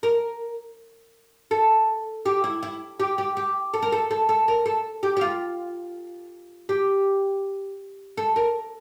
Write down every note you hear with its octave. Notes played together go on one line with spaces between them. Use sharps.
A#4
A4
G4
E4
E4
G4
G4
G4
A4
A#4
A4
A4
A4
A#4
A4
G4
G4
F4
G4
A4
A#4